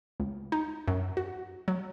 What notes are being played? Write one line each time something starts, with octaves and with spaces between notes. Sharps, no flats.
C#2
D#4
F#2
F#4
F#3